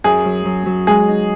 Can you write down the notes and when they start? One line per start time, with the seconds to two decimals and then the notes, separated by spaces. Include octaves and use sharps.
0.04 F#2 G#4
0.25 F#3
0.45 F#3
0.66 F#3
0.87 G#3 G#4
1.08 D#4